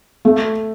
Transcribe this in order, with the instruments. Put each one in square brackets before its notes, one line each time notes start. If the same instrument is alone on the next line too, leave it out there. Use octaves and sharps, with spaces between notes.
[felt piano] A3